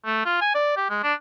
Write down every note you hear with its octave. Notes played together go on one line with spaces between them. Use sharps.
A3
F4
G#5
D5
G4
G#3
D4